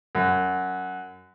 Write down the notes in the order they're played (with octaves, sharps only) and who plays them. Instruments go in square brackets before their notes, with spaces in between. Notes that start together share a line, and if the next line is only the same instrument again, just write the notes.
[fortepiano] F#2